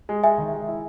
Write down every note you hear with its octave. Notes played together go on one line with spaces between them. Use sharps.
G#3
G#3 E5 G#5
D#3
G#3
E4